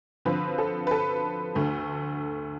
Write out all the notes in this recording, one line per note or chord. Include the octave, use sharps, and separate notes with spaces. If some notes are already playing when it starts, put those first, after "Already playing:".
D3 F3 C4 B4
A4
B4
A4
D2 D3 A3